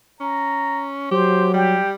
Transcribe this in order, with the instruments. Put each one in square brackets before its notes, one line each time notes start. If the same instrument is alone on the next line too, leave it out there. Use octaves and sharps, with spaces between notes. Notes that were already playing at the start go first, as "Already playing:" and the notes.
[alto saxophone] C#4 [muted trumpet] A#5
[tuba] F#3 [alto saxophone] G4 [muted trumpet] C5
[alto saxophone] G3 [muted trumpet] G4